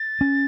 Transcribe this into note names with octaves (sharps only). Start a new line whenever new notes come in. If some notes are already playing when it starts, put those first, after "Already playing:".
Already playing: A6
C#4